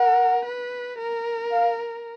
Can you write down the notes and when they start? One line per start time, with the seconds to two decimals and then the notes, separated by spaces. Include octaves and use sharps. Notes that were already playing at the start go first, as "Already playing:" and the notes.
Already playing: A#4 F#5
0.46 B4
0.98 A#4
1.52 F5